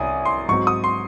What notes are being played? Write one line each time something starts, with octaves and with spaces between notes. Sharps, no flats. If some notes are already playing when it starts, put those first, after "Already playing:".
Already playing: C2 C#4 G#5 D#6
C6
G#2 F#3 C4 C#6
D#6
C6